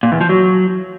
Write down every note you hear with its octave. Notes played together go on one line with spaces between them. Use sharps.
A#2
E2
F3
F#3